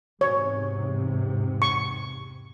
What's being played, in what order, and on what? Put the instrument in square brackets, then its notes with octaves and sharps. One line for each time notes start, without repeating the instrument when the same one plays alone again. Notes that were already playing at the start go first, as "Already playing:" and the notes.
[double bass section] E2 G#2 C3 [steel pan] C#5
[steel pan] C#6